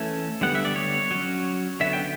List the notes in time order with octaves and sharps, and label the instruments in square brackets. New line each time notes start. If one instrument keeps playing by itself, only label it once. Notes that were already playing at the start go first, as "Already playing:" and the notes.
Already playing: [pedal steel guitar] E3 A3 C#4 A4
D3 G3 B3 F#5
E5
D5
C#5
F#3 C#4
D3 F#3 B3 E5
G5